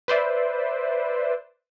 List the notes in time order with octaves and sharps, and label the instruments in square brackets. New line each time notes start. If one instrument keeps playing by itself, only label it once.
[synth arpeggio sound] B4 C5 D5 E5